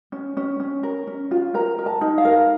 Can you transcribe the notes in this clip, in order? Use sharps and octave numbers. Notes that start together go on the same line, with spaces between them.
C#4
C#4
C#4
A#4
C#4
F4
A#4 A#5
A#4
A5
D#4
F5
A#4